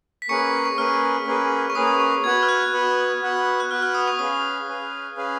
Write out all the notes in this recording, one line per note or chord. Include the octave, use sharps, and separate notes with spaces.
B6
A#3 C#4 G#4 B4 C#6 C#7
C#6
A#3 C#4 G#4 B4 F6
A#3 C#4 G#4 B4
C#6
A#3 C#4 G#4 B4 D#6
D#6
C#6
B3 F#4 B4 F#5 G#6
F6
F#6
B3 F#4 B4 F#5
B3 F#4 B4 F#5
F#6
B3 F#4 B4 F#5 F6
F6
D#6
C#6
C#4 G#4 B4 F5 D#6
C#4 G#4 B4 F5
C#4 G#4 B4 F5